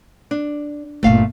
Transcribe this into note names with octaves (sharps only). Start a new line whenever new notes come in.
D4
G1 A#2 A3 F5